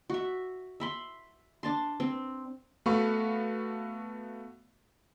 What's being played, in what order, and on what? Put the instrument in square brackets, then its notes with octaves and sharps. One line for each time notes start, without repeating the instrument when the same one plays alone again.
[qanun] F#4 E5
E5 B5 C6
D4 A5 C6
C4
[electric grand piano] A3 B3 F#4 F5 B5 C#6